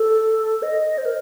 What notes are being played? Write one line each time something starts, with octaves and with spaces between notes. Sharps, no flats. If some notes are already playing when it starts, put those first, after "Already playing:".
Already playing: A4
D#5
C5
A#4